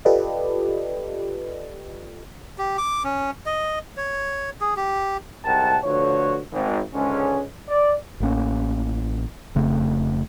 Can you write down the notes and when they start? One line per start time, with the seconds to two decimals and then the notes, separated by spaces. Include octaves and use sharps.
0.05 F4 G4 A4 B4 D5 D#5
2.58 G4
2.78 D6
3.04 C#4
3.46 D#5
3.97 C#5
4.61 G#4
4.77 G4
5.45 C2 G#2 A#4 F#5 G5 A5
5.84 D3 F3 A3 F#4 B4 C#5
6.52 G#1
6.94 C#2 G#2 D3 G#3 C#4
7.69 D5
8.20 A1 A2 A#3 C#4
9.55 F1 C#3 A3 C4